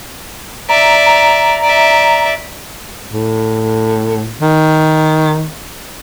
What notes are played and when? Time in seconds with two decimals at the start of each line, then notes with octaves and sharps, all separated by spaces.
0.69 D5 E5 A#5
1.06 A#5
1.63 D5 E5
3.13 A2
4.41 D#3